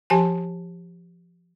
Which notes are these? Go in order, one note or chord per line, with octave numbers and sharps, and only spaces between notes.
F3 G4 G#5 A5